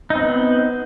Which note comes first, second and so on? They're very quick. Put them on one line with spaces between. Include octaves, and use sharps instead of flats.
D#4 C4 B3